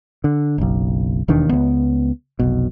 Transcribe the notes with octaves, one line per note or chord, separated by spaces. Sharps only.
D3
F#1 B1
E1 D#2 D#3 D4
C#2 B3
F1 B1 B2